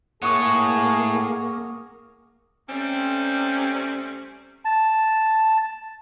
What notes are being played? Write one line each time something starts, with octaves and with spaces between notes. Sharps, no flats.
A2 A#3 G#4 C#5 F#5 C#6 D#6
C3 G3 A3 C4 C#4
A5